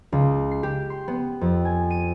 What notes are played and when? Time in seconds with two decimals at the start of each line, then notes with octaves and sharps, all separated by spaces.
0.12 C#2
0.51 C7
0.63 G4
0.90 C6
1.08 B3
1.41 F2
1.65 G#5
1.90 D#7